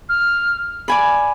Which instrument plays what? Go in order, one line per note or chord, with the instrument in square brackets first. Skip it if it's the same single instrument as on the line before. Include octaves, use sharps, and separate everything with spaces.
[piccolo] F6
[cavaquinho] D5 G#5 B5